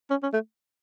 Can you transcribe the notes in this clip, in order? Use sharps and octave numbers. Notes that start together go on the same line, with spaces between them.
C#4
C#4
A3